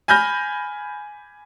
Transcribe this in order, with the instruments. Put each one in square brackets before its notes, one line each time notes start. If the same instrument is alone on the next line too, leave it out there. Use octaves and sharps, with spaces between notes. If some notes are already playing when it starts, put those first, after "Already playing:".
[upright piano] G#5 B5 F6 G6 A#6